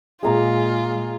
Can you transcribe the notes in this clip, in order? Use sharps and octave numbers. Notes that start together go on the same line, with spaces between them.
A#2 G#3 F4 G#4 A#5 D6